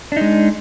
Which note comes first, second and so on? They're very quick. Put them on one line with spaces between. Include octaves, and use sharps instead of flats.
D4 D#4 G#3